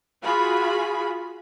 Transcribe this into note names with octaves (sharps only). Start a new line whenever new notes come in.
F4 F#4 G#4 B5